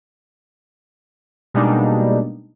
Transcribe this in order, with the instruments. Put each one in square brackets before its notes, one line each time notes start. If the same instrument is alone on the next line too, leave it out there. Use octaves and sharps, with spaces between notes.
[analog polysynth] B2 G3 G#3 A#3 D4 D#4